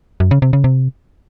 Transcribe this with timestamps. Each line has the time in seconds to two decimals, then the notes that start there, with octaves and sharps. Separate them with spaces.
0.20 F#2
0.31 C#3
0.42 C3
0.53 C#3
0.64 C3